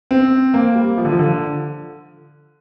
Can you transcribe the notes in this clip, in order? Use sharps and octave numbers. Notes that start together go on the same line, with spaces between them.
C4
A#3
G3
F3
D3
F3
D3